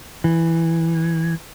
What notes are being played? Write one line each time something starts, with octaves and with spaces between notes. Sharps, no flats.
E3